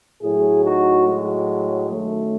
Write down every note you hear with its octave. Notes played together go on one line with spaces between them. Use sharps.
A2 F#3 E4 G#4
D#4 F#4
G#3
F#2 D#3 F#3 A3